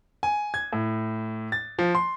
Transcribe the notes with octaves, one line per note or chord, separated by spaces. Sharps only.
G#5
G#6
A2
A6
F3
C6